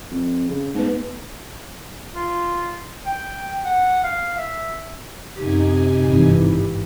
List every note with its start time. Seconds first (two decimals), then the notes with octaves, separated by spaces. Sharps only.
0.11 F2
0.49 C#3
0.74 G#2 A3 B3 B4
2.14 F4
3.06 G5
3.65 F#5
4.04 F5
4.38 E5
5.36 F#2 C3 D#4 G4 G#5
6.06 G#1 G2 E3